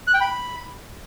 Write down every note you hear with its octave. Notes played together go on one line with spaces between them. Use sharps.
F#6
G5
B5